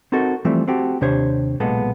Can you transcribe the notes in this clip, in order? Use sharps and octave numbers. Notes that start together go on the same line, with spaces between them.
C4 D#4 F#4 A4 A#4
E3 F3 G3 A3 C4
C4 F#4 G4 A4
D#2 C3 D4 G4 C5 C#5
B1 A#2 G#3 B3 A4